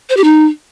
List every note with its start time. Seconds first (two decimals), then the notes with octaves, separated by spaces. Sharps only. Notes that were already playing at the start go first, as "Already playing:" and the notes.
0.10 C5
0.17 G4
0.24 D#4